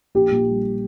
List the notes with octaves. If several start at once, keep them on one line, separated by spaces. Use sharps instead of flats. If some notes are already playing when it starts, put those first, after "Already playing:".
A#1 G4
A#2
G3